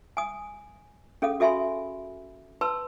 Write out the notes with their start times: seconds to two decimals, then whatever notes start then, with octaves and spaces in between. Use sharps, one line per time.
0.17 G#5 D#6
1.22 C#4 G#4 A4 F5 D#6
1.40 F#4 A4 E5 G#5 B5 C6
2.61 B4 A5 C6 E6